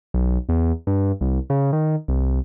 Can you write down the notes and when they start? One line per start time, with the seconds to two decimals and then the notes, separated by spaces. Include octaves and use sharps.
0.14 B1
0.49 E2
0.87 G2
1.21 C2
1.50 C#3
1.73 D#3
2.08 C2